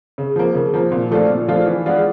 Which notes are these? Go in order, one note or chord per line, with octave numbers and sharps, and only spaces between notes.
C#3
F3 A#3
C#3
F3 A#3
A#2
F3 A3 D4 F4
A#2
F3 A3 D4 F4
E3
G#3 B3 D4 F4